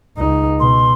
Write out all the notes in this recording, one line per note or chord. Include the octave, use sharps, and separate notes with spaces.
C#2 D#4
B2 C6